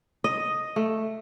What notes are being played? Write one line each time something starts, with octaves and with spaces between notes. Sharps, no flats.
D#5
A3